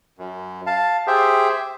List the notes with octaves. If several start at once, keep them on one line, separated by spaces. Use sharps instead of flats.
F#2
F5 A5
G4 G#4 C5 E5 G5